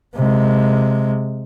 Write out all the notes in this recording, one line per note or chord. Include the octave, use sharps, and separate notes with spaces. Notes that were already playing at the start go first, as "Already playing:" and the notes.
C3 G#3